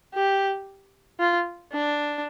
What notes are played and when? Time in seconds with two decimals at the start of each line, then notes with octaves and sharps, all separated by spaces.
0.14 G4
1.19 F4
1.73 D4